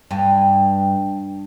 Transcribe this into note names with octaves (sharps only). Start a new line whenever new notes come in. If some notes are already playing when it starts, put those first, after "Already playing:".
G2